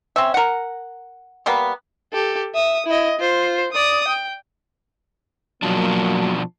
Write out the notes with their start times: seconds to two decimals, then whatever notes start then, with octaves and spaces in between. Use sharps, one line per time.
0.16 C4 C#4 E5
0.34 A#4 F#5
1.46 G3 A#3 B3 B4
2.13 G4 A4
2.54 E5 D#6
2.86 E4 D#5
3.19 F4 C5
3.72 D5 D#6
4.08 G5
5.63 B2 F3 F#3 A#3 D4